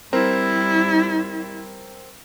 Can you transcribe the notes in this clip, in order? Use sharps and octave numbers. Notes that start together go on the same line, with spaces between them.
G3 C4 E4 A#4 C5